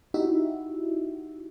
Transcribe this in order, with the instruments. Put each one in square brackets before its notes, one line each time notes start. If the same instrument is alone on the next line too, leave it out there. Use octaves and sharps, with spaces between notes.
[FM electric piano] D#4 E4 F#4 G4 E5